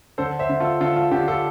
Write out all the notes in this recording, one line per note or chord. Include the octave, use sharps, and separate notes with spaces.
D3 A4 C5
C5 E5
D3
F4 A4
D3 F4 A4
F4
D3 G4
F4 A4